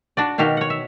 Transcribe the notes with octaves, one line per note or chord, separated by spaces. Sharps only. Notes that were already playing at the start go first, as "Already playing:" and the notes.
D4 F#4 D5
B2 D#3 F#4 G4 F5
C#5 F#5
E5